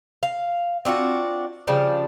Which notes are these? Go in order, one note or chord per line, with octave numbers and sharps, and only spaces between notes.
F5
C4 D4 F4 F#4
C#3 F3 G3 D4